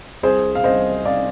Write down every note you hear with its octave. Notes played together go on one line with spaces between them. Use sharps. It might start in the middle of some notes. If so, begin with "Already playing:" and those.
C2 G#4 C5
F5
C2 C5 D#5
C2 D5 F5